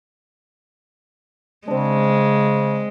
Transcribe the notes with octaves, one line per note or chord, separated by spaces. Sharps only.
C#3 G#3 C4 D4